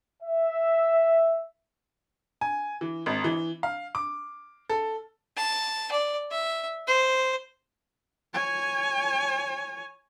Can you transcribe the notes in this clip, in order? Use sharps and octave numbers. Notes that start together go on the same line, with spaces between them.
E5
G#5
E3
G#1
E3
F5
D6
A4
A5
D5
E5
C5
C#5 G#5